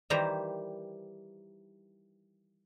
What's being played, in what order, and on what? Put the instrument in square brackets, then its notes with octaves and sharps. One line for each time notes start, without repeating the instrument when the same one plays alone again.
[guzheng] D#3 E3 G3 C5 A#5